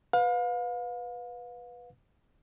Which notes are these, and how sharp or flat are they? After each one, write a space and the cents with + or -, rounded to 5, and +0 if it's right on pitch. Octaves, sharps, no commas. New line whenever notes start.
B4 +0 F5 +35